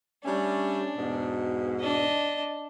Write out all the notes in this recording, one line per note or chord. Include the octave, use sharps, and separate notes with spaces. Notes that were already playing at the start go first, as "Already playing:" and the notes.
G3 A3 C#4 D4
E2 G#2 B2
D4 D#5